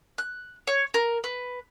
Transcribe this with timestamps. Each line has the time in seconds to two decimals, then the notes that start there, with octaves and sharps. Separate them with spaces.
0.18 F#6
0.67 C#5
0.94 A#4
1.24 B4